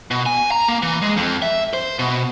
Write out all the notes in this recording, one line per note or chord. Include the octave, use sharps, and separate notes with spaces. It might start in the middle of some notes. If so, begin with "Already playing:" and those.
B2
G#5
A#5
A#3
E3
G#3
F2
E5
C5
B2